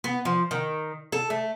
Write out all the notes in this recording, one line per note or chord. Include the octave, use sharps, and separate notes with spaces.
B3
F3
D#3
A4
A3